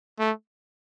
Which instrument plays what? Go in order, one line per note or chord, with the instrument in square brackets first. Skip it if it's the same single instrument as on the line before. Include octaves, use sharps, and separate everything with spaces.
[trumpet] A3